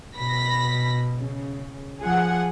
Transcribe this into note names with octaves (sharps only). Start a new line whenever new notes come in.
B2 B5 A#6 B6
C#3
F3 G#4 F#5